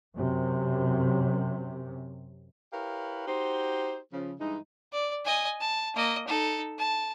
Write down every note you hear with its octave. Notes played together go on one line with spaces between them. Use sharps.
F#2 C3
E4 G4 A#4 B4 C#5 F5
D#4 F#4 G4 C5
C#3 F3
G2 E3 G#3 D#4
D5
D#5 G#5
A5
A#3 D#5
D#4 A4
A5